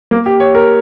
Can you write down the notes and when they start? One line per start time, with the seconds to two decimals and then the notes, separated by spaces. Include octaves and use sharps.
0.11 A#3
0.26 G4
0.40 C#5
0.55 A#4